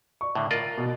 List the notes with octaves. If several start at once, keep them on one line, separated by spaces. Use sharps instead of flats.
D5 C#6
A2 D3
F4 A#4 D5 D#5
B2